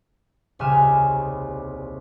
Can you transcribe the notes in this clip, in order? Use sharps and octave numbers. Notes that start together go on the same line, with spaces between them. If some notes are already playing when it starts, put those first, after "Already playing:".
D#1 C2 C#3 G#5 F6 E7